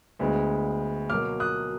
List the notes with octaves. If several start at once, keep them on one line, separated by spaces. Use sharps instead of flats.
D2 D3 G#3 B3
B2 F#3 A#3 D6 F6
D#6 F#6